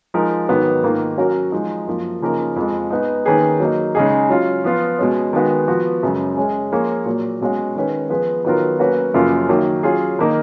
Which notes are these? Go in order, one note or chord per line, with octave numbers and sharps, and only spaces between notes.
F3 G#3 D#4 A#4
G#2 D#3 F#3 B3
G#2 D#3 A#3 F4
F#3 C#4 F#4 A#4
F3 G#3 D#4
F#2 F3 A#3
C#3 F3 A#3 D#4 A#4
F2 F3 G#3
G#3 B3 D#4
D#3 A#3 C#4 G#4 B4
F#3 A#3 D#4
C#3 G#3 D#4 G#4
F#3 C#4 F4
F3 B3 F4
B2 G#3 C#4
D#3 G#3 B3 F#4
F3 B3 F#4
F#2 C#3 G#3
G#3 C#4 G#4
F3 A#3 F4 G#4 C#5
A#2 F#3 A#3
B2 G#3 C#4 F#4
D#3 G#3 C#4 G#4 B4
F3 B3 F4 G#4 B4
D#3 F#3 B3 F4 A#4
F#3 A#3 C#4 F#4 B4
F#2 C#3 F3 A#3 F4
D#3 F#3 A#3
F#3 C#4 F4 G#4
D#3 A#3 D#4 A#4